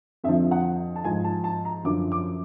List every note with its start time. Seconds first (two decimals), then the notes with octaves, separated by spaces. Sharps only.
0.24 F2 D3 F3 E5
0.51 F#5
0.96 A5
1.04 G#2 F3 G#5
1.24 A5
1.44 A5
1.65 A#5
1.84 F#2 D3 F3 D6
2.12 D6